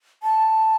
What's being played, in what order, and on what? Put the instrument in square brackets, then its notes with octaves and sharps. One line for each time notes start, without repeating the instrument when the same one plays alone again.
[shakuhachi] A5